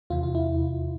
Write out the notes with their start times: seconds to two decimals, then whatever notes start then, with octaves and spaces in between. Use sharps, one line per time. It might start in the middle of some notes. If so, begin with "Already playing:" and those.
0.10 E2 C3 E3 F4
0.23 F4
0.35 E4